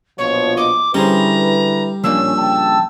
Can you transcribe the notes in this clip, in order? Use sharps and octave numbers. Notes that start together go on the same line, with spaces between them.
A#1 B2 F3 C#5
D#5 D6
D3 G3 C#4 E4 G#4 B4 C5 A#5
F3 A#3 C#4 D4 E6
C#3 G5 A5